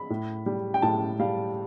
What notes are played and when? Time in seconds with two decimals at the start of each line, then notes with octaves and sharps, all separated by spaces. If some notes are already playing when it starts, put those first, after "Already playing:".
Already playing: B5
0.10 A2
0.46 G3
0.74 G5
0.82 A2 A5
1.20 G3 F5